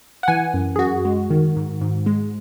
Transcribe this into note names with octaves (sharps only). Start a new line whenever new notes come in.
F#5
E3 G#5
F#2
G#4
F#2 F#4
G#3
D#3
G#2
G#2
G#3